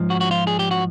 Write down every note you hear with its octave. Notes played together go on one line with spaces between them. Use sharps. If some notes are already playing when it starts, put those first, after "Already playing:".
Already playing: G#2 F3
F#4
F#4
F4
G#4
G4
F#4